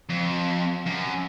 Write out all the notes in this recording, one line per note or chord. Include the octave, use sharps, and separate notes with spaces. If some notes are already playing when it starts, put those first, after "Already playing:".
F2
F#2